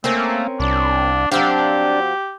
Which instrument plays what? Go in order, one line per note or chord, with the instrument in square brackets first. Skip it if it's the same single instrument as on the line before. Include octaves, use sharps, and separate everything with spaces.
[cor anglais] A3 [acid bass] A#3 [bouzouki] C4 C#4 A#4
[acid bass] C2 [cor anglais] D4
[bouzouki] F#3 C4 F5 [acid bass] D4 [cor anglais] G4